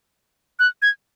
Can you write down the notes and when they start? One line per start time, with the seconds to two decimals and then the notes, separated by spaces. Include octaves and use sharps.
0.59 F#6
0.82 G#6